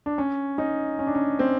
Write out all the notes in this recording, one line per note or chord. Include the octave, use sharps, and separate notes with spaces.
D4
C#4
C#4 D#4
C#4
D4
C#4
C4